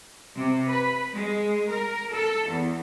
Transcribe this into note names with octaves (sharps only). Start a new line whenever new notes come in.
C3
B4
G#3
A#4
A4
E2